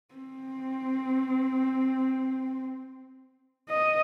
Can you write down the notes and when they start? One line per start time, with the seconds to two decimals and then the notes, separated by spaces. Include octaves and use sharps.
0.14 C4
3.69 D#5